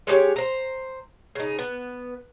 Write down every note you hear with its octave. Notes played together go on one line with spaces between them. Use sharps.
G#3 A3 G4 C#5
C5 A#5
C#3 D#4
B3